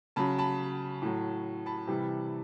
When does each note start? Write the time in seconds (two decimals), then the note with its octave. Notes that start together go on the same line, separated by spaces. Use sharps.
0.16 C#3 F#3 A5 B5
0.38 A5 B5
1.02 A2 F#3
1.66 A5 B5
1.87 C3 E3 G3